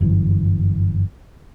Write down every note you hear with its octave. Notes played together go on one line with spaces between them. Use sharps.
G1 F#2 E3